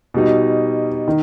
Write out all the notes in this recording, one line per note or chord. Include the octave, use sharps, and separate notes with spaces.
B2 G3 D#4
D#3